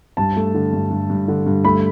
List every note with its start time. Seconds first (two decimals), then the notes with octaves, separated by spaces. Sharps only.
0.17 G2 A5
0.36 A3
0.54 D3
0.73 G2
0.91 G2
1.10 G2
1.28 D3
1.46 G2
1.65 A3 B5